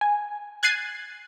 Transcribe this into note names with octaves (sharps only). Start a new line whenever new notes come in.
G#5
F#6 G#6 A6 C7 D#7